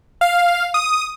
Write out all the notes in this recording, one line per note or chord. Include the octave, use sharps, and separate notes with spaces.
F5
D#6